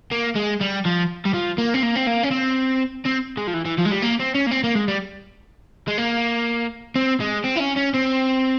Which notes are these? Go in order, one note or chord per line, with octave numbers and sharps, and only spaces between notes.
A#3
G#3
G3
F3
G3
F3
A#3
C4
A#3
C4
A#3
C#4
C4
C4
G#3
F3
E3
E3
F3
G#3
G3
A#3
C4
C#4
A#3
C4
A#3
G#3
G3
G#3
A#3
C4
G#3
C4
E4
C#4
C#4
C4